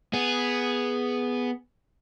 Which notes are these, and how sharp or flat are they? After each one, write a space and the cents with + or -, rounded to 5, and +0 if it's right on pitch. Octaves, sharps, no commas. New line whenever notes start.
B3 +0 G#4 +0